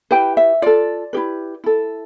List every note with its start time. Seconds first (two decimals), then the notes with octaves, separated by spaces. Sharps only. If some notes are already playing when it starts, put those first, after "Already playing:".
0.11 E4 G4 B4 G5
0.37 E5
0.62 F4 A4 D5
1.13 E4 G4 B4
1.64 E4 A4